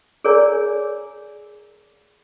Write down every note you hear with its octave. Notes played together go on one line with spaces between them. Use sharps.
G#4 A#4 C#5 D5 G#5 A#5